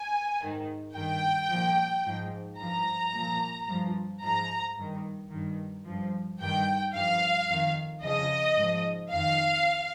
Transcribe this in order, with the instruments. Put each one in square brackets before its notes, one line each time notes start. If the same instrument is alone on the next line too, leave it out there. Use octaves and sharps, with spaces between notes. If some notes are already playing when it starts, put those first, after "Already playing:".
Already playing: [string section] G#5
G#2 D#3
G2 D#3 G5
A#2 F3
G#2 F3
G2 F3 A#5
A#2 F3
G2 F3
G#2 F3 A#5
G2 D#3
G2 D#3
G2 F3
G2 D#3 G5
G2 F3 F5
F2 D#3
F2 C#3 F3 D#5
G#2 F3
F2 D#3 F5